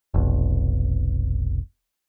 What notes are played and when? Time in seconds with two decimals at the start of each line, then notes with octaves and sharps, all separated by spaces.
0.14 F1 B1